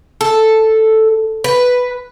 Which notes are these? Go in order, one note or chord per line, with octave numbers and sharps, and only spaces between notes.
A4
B4